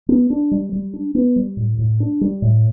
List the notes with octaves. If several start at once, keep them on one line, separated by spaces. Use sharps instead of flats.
B3
D4
G3
G3
D4
B3
G3
A2
A2
D4
G3
A2